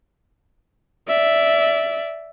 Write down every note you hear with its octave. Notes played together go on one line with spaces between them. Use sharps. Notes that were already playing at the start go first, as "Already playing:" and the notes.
D5 E5